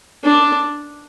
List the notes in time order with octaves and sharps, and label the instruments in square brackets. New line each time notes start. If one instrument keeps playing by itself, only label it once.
[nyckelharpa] D4